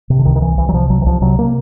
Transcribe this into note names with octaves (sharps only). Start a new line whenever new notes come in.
C3
D3
C2 D#3
D#3
C2 E3
C2 E3
F#3
C3 F3
C2 F#3
E3
C2 F3
C3 F#3
C3 A#3